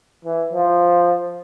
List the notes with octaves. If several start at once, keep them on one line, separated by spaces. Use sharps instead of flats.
E3
F3